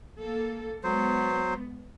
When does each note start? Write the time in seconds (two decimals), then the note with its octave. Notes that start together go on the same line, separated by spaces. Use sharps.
0.21 A#3 A4
0.84 F#3 G#3 B3 C5